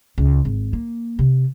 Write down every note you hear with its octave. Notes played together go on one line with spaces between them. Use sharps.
C#2
G#1
A#3
C3